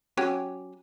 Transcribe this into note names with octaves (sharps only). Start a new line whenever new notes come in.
F#3 C#4 G4